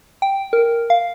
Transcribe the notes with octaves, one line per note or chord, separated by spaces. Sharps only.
G5
A#4
F5